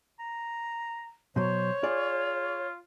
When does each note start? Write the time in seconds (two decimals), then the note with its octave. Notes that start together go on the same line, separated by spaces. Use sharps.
0.19 A#5
1.36 B2 F#3 C5 C#5
1.83 F4 G#4 D5